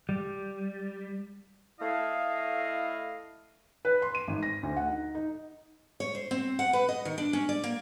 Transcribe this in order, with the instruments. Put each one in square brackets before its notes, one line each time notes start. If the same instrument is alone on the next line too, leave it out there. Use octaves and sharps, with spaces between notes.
[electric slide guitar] G3
[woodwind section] A3 E4 D#5 F5
[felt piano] B4
C6
D#7
G#1
A#6
D2
F#5
D#4
D#4
[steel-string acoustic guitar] C#5
C5
C4
F#5
B4
D#5
D#3
D4
C#4
D5
A#3